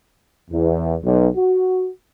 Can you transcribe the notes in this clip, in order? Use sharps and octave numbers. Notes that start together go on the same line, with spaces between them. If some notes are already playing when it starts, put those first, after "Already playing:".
E2
B1
F#4